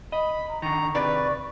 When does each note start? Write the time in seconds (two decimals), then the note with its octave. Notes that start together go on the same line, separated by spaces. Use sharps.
0.12 D#5 B5
0.48 A#5
0.62 D3 D#3 A#5 C#6
0.95 C3 D#3 B4 D5